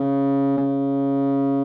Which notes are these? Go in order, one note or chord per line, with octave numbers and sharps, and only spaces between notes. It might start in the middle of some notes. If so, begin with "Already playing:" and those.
Already playing: C#3
C#3